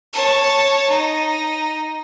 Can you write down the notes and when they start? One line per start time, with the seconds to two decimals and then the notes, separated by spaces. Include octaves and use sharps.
0.13 C#5 A5
0.89 D#4